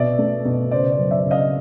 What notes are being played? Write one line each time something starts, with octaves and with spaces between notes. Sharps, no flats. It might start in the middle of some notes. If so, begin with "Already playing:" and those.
Already playing: B2 D5 E5
A3
B2
C#3 C5 D5
C5 D5
F#2
D5 E5
C#3
D#5 F5